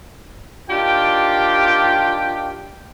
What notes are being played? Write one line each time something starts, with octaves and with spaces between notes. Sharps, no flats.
D#3 D4 F4 G4 G5